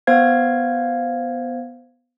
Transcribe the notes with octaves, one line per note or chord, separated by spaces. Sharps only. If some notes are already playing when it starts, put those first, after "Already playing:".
B3 C5 F5 G#6